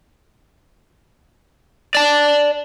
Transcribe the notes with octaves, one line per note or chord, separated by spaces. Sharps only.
D5 A5